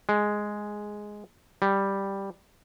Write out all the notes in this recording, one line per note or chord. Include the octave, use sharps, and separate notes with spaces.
G#3
G3